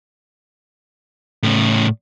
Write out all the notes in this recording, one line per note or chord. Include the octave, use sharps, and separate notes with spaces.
A2 C#3